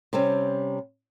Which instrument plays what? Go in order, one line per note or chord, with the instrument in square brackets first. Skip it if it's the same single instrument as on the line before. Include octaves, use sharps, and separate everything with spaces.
[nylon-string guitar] C3 G3 C4 C#4